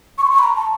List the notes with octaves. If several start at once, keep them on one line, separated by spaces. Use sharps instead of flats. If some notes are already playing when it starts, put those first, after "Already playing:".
C#6
C6
C#6
B5
A#5
A5